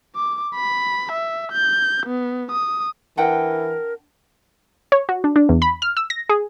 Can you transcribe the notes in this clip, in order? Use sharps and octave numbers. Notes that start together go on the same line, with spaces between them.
D6
B5
E5
G6
B3
D#6
E3 D4 A#4 F#5 G5
C#5
F#4
D4
D4
E2
B5
F6
E6
A#6
G#4